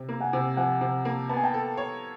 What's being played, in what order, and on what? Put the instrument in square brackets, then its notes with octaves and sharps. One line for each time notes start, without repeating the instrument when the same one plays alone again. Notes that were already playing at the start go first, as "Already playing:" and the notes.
Already playing: [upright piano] C3
A#3
[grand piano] F#5 G#5
[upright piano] C3
[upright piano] F3 [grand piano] F#5 G#5
[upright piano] C3
A#3
[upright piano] B3 [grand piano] A5
[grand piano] G#5
G5 A5
[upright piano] A4
C#5